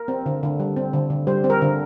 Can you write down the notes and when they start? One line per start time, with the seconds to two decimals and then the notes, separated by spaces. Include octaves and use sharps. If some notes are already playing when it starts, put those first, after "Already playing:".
Already playing: A#4
0.08 C4
0.26 D3
0.43 D3
0.60 G3
0.76 C4
0.93 D3
1.10 D3
1.27 G3 C5
1.44 C4
1.50 A#4
1.62 D3